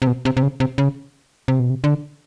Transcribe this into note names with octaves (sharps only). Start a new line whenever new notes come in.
C3
B2
C3
C3
C#3
C3
C#3
C3
B2
C3
D3